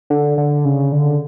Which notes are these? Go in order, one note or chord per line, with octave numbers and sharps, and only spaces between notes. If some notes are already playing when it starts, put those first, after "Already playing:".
D3
D3
C#3
D3